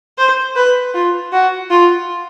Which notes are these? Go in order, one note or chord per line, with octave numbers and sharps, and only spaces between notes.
C5
B4
F4
F#4
F4